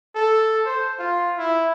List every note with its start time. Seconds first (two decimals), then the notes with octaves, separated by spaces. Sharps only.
0.15 A4
0.66 C5
0.99 F4
1.37 E4